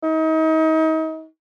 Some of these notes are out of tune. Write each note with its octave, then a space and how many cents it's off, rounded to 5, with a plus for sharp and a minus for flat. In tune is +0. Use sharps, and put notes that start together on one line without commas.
D#4 +35